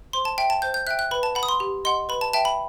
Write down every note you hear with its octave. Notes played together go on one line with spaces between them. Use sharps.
C5 C6
A5
E5 G5
A5
C5 G6
G6
E5 G5 F#6
F#6
B4 B5
A5
F#5 B5
D#6
C6
G4
D#5 F#5 C6
B4 B5
A5
E5 G5 A5
B5